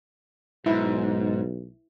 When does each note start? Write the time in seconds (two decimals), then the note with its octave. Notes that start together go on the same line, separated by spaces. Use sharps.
0.66 B1 G#2 E4